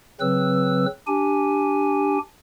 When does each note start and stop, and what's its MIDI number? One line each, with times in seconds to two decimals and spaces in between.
0.20 0.86 49
0.20 0.86 54
0.20 0.86 60
0.20 0.86 71
0.20 0.86 88
1.07 2.18 62
1.07 2.18 67
1.07 2.18 80